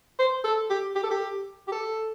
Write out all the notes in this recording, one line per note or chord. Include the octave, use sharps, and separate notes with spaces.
C5
A4
G4
G4
A4
G4
G4
A4